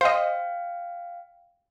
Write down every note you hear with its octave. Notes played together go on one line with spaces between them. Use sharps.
C5 D#5 F5 G5